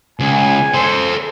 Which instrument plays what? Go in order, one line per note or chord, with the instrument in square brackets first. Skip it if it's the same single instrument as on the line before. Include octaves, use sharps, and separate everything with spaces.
[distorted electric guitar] C#2 [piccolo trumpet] G#5
[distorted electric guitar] A4 C5